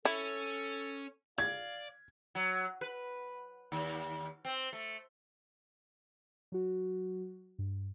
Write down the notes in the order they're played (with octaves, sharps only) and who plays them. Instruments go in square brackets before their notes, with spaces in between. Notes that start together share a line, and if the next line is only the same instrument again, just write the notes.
[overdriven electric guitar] C#4 [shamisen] E4 [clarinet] A4
[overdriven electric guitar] D5 [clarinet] F5 [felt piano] G#6
[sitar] F#3
B4
D#2
C4
A3
[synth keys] F#3 F#4
G2